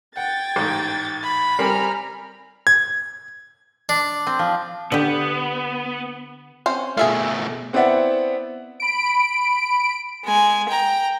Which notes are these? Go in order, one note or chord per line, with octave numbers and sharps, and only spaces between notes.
F#5 G5 G#6 A6
A1 G#2
B5
G3 C4 A#4 G#5 A#5 F6
G#6
D4
C4
F3
D3 B3 G4
C4 C#4 C5
B2 A3 G#4 E5 F5
B3 C4 E4 D5 E5 F#5
B5 D7
G#3 G#5
G5 A#5